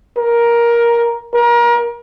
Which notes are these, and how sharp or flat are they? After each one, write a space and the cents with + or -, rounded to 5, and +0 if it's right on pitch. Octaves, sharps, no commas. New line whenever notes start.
A#4 +10
A#4 +30